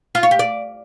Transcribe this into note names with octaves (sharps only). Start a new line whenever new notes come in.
F4
C#5
G4
D5